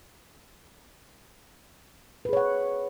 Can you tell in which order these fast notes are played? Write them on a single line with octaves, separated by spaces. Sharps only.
B4 G#4 C#5 F#5